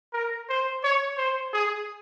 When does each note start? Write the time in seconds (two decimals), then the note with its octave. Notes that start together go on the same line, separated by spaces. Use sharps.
0.13 A#4
0.49 C5
0.84 C#5
1.18 C5
1.54 G#4